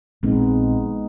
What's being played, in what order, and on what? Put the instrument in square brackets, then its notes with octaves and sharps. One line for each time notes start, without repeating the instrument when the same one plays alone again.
[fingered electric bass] A#1 C4 [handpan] G#3 B3 D#4